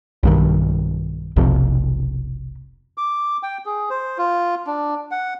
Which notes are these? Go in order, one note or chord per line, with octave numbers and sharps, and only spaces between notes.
B1 G2 D#3
F1 B1 F2 C3
D6
G5
G#4
C5
F4
D4
F#5